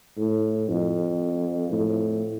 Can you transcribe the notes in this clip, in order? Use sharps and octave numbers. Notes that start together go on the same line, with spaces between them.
A2
F2
A2